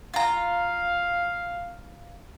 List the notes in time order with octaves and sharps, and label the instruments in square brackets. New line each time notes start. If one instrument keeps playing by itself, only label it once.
[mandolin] F4 A#5 [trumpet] F5